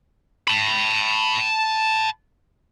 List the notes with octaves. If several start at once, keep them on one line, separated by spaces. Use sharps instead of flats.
A5 B5